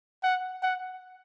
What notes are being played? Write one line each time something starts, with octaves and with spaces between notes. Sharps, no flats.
F#5
F#5